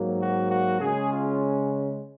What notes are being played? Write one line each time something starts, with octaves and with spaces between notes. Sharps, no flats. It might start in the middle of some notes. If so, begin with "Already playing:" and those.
Already playing: G#2 F#3 A#3
F#4
F#4
C#3 G#3 C#4 G#4
F4